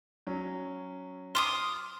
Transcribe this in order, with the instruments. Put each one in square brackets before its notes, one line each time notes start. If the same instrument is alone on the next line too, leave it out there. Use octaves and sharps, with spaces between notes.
[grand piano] F#3 C#4
[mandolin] C6 D6 D#6 [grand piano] F6